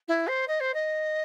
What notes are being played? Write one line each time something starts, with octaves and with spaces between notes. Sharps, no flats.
E4
C5
D#5
C5
D#5